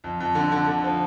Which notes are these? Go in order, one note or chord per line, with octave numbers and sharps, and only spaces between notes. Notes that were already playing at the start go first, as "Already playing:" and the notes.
F2
F2
D3
D3
D3
F3